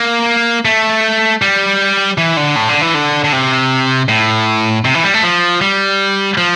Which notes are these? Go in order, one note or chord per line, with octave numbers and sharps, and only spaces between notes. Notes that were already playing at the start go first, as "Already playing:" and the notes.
Already playing: A#3
A3
G3
E3
D3
A2
D3
E3
D3
D3
C3
A2
C3
E3
G3
A3
F3
G3
F3